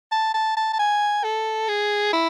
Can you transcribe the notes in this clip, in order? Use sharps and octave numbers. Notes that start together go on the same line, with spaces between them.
A5
A5
A5
A5
G#5
A4
G#4
E4